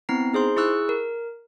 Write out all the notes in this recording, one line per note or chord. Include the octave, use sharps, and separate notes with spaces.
B3 C4 E4 A#5 C7
D#4 G#4 C5 C6
E4 G#4 C#6 E6 F#6
A#4